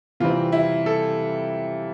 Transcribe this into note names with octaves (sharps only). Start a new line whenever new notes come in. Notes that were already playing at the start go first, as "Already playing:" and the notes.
C3 E3 G3 C4 F4
E4
A4